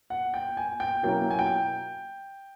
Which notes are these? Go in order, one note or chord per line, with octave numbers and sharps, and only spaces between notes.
F#5
G5
G#5
G5
B2 F#3 A#3 C#4 E4 G5
G#5
G5